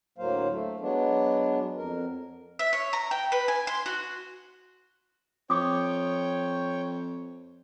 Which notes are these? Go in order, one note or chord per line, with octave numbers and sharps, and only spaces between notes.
D2 A2 F#3 A#3 C5 F5
A3
F#3 G#3 B3 D4
F2 A#4
E5
C#5
A#5
G5
B4
G#5
C6
F#4
F2 C#5 G5 D6 D#6